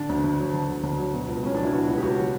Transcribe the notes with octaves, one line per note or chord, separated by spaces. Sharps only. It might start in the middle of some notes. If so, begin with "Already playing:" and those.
Already playing: D3 D4
D2
D2
F#3
D3
D2
D2
F#3
B2
C#2
C#2 C#4
F#3 D4
E4
B2 F#4
C#2
G4
C#2 F#4
F#3